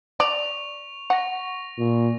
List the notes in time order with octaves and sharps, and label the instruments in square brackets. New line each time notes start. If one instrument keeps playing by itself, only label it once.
[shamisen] D5 [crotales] C#6 F7
[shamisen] F#5 [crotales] C#6 A#6
[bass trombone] A#2